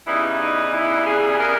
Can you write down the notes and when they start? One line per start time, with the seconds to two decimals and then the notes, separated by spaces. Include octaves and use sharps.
0.07 C#3 E3 G3 B3 D#4 E4
0.41 D#4
0.74 E4
1.07 G#4
1.40 A#4